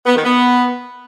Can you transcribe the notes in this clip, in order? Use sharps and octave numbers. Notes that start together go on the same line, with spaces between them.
B3
D#3
B3